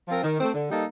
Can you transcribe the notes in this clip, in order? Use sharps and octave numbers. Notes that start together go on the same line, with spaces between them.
F3 C4 F4 A#4
D#3
A3 C4
D3
G3 A#3 D#4 A4